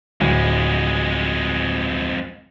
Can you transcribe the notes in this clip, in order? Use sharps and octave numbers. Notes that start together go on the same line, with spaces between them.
D1 F2 G#3